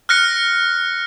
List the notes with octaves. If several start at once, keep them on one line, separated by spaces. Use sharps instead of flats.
F6 F#6 A#6 C#7